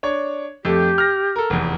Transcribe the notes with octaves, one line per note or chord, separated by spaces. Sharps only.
D4 C#5
F2 A3 G4
F6 A#6
A4 A#4
F1 E2